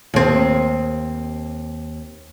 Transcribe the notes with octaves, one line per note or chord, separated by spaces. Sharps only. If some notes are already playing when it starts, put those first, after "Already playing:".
D#2 C4